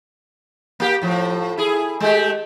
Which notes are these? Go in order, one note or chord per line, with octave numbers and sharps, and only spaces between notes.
A#3 G4
A2 F3
E4 G#4
G#3 A3 G4